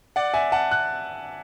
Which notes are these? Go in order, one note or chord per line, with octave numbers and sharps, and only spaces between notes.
D5 F#5
E5 G#5
F#5 A5
F#6